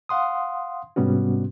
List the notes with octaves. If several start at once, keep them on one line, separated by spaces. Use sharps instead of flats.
F5 F#5 C6 D#6
G#2 C3 G3 B3 C#4 F#4